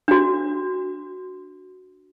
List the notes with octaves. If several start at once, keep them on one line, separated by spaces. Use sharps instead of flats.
D4 F#4